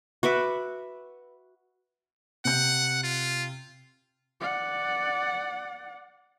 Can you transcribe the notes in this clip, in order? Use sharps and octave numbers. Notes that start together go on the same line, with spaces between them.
F#4 B4 E5 D6
C3 F#5 G6
F4
D5 F#5